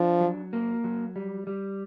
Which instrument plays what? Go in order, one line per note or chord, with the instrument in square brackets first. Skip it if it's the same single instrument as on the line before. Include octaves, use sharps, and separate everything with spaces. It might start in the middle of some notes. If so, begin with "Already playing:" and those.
Already playing: [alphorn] F3 [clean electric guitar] D4
[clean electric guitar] F#3
A#3
F#3
G3
G3